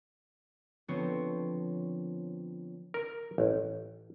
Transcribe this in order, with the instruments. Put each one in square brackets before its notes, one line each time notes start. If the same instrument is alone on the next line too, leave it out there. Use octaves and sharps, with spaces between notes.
[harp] D3 F3 B3 C4 C5 C#5
[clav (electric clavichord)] A#4
A1